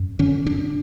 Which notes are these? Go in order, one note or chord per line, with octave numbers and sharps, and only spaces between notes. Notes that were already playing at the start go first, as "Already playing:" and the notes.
Already playing: F#2
D3 C#4
D3 D4